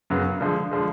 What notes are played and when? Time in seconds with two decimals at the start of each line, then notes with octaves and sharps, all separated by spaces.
0.10 F#2 C#3 F#3 B3
0.41 D3 F3 G#3
0.71 D3 F3 G#3